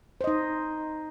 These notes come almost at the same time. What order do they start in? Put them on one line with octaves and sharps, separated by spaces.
C5 D#5 D#4